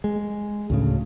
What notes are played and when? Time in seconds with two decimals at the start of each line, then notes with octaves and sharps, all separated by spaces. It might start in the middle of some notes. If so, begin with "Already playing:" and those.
0.04 G#3
0.70 D2 A2 C#3